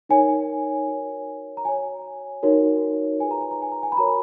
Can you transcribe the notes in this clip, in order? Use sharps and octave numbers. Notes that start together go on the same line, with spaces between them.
D#4 A#4 C#5 G#5
F#4 A#4 C#5
A#5
F#4 C#5 G#5
D#4 F#4 A#4 C#5
F4 G#4 B4 G#5
A#5
G#5
A#5
G#5
A#5
G#5
B5
F#4 A#4 C#5 A#5